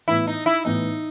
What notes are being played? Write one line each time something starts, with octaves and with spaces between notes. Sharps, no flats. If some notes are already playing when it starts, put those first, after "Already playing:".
A2 E3 B3 E4
D#4
E4
A2 E3 B3 D#4